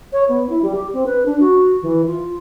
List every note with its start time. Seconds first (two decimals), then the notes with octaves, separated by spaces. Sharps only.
0.12 C#5
0.28 B3
0.49 E4
0.62 G3
0.75 G4
0.93 C4
1.06 B4
1.25 D4
1.40 F#4
1.82 E3
2.07 F4